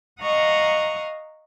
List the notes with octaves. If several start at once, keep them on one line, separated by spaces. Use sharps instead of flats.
D#5 F5 F#5 A#5 C#6 D#6